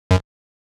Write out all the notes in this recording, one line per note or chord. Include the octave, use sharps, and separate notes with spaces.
F#2